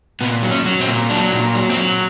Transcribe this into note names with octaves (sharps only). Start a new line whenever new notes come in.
A#2 B3
F#3
C#4
F#3
C4
A#2
F#3 D4
A#2
F#3
C4
F#3